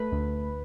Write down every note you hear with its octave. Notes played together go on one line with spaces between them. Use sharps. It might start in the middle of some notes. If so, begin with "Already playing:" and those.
Already playing: A3 B4
D2